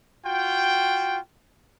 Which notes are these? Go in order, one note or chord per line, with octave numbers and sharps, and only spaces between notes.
F4 F#4 G5